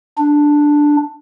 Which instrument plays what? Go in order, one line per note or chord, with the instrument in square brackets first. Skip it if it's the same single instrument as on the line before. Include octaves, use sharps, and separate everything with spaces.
[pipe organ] D4